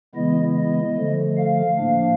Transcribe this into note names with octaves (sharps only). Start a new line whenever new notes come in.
C#3 E3 G#3 B3 E4 D#5
D#5
D3 F3 A3
F5
A2 F3 A#3 D4